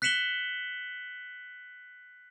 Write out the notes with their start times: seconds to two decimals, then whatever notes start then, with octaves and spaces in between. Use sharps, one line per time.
0.02 F#6 B6 C#7 E7 F#7 G7